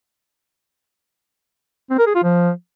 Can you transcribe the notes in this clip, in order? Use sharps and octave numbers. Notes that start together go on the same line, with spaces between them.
C4
A#4
G#4
F4
F3